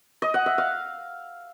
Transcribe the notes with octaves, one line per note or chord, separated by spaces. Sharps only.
D#5
F#5
E5
F5